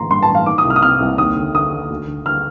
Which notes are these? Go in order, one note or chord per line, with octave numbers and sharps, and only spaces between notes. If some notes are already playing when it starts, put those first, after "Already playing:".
Already playing: A1 D3 A#5 C6
G2 C6
A5
A1
F5
D#3 D6
D#6
C2
F6
D#6
C3 F6
C2
D#2 D#6
D3
D3 D#6
D#2
D2
D3
D3 F6